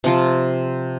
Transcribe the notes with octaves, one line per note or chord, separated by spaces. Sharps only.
C3 F3 F4